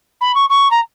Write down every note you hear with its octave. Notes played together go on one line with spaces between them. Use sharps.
B5
C#6
C#6
A#5